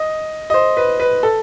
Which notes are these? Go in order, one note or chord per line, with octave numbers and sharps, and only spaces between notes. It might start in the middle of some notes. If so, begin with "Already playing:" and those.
Already playing: D#5
D#5
C5
B4
B4
A4